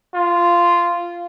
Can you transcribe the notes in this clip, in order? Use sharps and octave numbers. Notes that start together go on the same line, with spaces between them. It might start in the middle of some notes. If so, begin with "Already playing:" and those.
F4